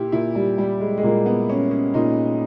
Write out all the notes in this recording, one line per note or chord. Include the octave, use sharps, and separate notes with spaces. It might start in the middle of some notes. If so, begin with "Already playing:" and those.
Already playing: A#2 E4 G4
A#2 E4
G3
G3
G#3
G#3
A#2 A#3
B3
C#4
C#4
A#2 D#4